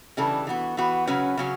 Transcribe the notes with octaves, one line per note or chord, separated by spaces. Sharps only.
C#3 E3 G3 D4 A4
E3 B3 F#4
E3 B3 F#4
C#3 F#3 C#4 F#4 B4
C#3 F#3 C#4 F#4